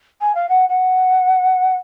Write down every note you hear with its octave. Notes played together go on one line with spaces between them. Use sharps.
G#5
F5
F#5
F#5